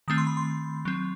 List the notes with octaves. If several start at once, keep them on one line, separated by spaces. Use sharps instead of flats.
D#3 A3 C4 D#6
C6
B5
C6
F#3 C4